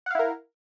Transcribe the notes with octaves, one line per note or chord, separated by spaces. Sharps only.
E4 A#4 F5 F#5